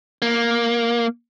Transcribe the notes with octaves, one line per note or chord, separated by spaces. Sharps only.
A#3